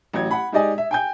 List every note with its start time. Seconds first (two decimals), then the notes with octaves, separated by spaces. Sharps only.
0.13 A1 F#3 G#6
0.31 F#5 B5
0.52 G#3 D#4 G4 D5 D#5 G#5
0.78 E5
0.91 G5 G#5 G6